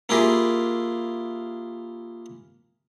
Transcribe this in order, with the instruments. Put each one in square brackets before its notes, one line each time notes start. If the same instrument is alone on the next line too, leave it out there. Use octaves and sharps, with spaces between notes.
[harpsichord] A#3 E4 F4 G4 G#4 A#4